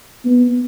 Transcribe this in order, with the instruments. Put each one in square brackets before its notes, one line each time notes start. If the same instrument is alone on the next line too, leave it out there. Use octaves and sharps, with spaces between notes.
[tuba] B3